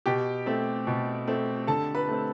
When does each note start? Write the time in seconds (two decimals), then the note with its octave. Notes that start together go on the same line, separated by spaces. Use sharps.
0.06 B2 G4 G5
0.46 A3 C4
0.87 B2
1.28 A3 C4
1.67 D3 A4 A5
1.95 B4 B5
2.08 A3 C4